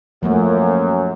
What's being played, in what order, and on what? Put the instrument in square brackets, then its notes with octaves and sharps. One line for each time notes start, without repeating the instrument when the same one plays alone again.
[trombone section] F#2 [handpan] F3 A3 A#3